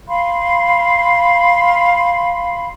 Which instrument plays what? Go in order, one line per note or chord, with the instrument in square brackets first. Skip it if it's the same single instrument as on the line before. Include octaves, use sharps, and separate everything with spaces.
[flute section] F5 B5 C6